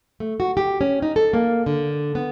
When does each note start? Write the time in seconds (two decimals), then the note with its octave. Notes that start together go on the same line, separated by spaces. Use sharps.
0.20 A3
0.40 F#4
0.57 G4
0.81 C#4
1.02 D#4
1.16 A4
1.33 A#3
1.66 D3
2.15 B3